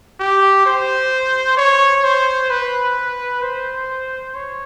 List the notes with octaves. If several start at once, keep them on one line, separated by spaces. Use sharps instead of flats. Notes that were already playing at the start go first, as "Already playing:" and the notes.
G4
C5
C#5
C5
B4
C5
C#5